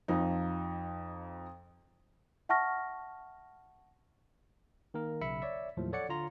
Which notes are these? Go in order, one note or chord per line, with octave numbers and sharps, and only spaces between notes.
F2 F3 D#4
E5 F#5 A5 C#6 F6 A#6
D#3 A#3 A#4
B1 C#3 E5 B5 C#7
C#5 D5 E5
D#2 A2 F3 F#3
A4 C#5 D5 F#5 C#7
D3 F4 A#5 C6